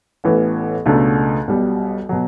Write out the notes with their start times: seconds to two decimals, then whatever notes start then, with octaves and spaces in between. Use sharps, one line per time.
0.24 A1 A2 E3 B3
0.86 C#2 B2 A3 D4
1.48 B1 B2 G3
2.09 B2 F#3